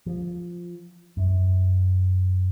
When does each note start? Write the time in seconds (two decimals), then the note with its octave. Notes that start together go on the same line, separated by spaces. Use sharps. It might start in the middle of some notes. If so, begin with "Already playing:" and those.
0.06 F3
1.17 F#2